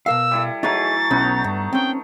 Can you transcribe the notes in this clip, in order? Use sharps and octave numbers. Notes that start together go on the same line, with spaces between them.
B2 A#4 F5 E6
G3 E4 A4
E3 F#3 A3 D#4 G#4 A6
B1 B3 C#4 D#4
G2 A5
C4 C#4 G5